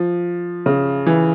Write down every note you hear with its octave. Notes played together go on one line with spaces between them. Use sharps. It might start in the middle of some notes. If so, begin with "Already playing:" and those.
Already playing: F3
C#3
E3